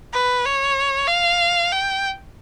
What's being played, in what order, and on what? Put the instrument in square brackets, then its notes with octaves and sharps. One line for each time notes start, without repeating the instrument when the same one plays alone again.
[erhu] B4
C#5
F5
G5